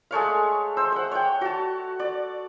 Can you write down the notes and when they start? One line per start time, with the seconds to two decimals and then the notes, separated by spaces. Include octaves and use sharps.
0.11 G#3 A3 C#5 F5
0.77 C5 E6
0.92 C5 F#5
1.11 C#5 G5
1.41 F#4 A5
1.99 D5